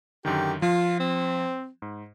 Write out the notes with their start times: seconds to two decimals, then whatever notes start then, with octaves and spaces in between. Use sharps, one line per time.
0.25 F#2 D3 D#3 G4
0.62 F3 F4
1.00 C4
1.82 G#2